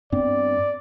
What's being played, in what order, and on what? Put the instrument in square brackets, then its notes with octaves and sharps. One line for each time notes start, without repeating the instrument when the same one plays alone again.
[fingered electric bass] G2 B3 C4 [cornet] D5